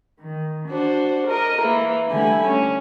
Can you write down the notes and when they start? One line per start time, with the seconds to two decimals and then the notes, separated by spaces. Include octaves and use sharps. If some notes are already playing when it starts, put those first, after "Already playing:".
0.20 D#3
0.69 D4 F#4 C5
1.28 A#4 D#5 A#5
1.61 E3 A#3
2.10 D3 G3 A3 E4 G#5
2.46 C#4